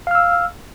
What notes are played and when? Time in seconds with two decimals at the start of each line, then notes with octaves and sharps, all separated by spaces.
0.07 F5
0.11 F6
0.15 E6